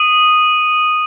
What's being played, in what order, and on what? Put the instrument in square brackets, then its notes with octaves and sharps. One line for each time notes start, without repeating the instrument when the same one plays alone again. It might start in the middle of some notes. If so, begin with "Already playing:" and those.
Already playing: [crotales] D#6 D#7